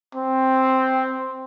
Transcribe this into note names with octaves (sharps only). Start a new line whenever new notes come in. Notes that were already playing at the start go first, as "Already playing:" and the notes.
C4